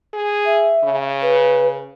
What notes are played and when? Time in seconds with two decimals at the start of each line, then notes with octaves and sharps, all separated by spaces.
0.14 G#4
0.46 E5
0.84 C#3
1.22 B4